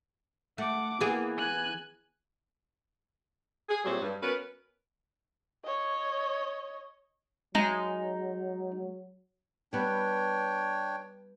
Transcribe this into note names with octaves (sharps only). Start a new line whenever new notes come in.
A3 F#5 D6
E3 A#3 B3 G#4
G#5 F#6
G#4
A#2 F#3 G3 A3 C4 G#4
G2
B3 C#4 F#4 A#4 B4
C#5 D#5
F#3 G#3 D#4
G3 B3 D4 C#5 G5